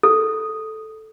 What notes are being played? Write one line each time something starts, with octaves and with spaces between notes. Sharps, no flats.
A4